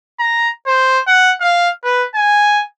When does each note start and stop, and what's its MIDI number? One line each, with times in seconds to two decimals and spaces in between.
0.19 0.49 82
0.67 1.00 72
1.07 1.32 78
1.41 1.69 77
1.84 2.06 71
2.15 2.64 80